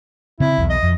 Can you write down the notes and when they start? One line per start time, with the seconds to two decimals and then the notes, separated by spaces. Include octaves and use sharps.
0.40 C#3 C4 E4
0.58 B1 E2
0.70 D#5
0.83 F2